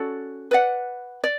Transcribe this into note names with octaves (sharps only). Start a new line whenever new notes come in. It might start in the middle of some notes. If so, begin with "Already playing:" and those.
Already playing: C#4 F#4 A4 D5
B4 D5 F#5
D5